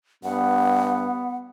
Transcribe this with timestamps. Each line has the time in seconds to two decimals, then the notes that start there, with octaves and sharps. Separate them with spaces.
0.24 G2 B3 F#5